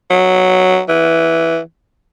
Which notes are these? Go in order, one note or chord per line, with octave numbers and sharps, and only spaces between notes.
F#3
E3